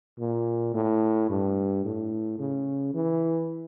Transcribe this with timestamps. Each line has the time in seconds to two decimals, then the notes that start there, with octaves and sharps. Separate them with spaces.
0.19 A#2
0.74 A2
1.30 G2
1.85 A2
2.39 C#3
2.94 E3